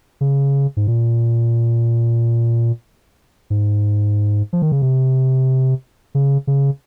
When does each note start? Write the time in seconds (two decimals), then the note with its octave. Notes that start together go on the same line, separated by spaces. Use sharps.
0.21 C#3
0.77 G#2
0.87 A#2
3.50 G#2
4.53 F3
4.62 D#3
4.72 C#3
4.82 C3
6.15 C#3
6.47 C#3